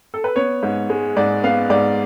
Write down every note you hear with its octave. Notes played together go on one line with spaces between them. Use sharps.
A4
B4
B3 C#5
G#2
G#3
G#2 D5
B3 F5
G#2 D5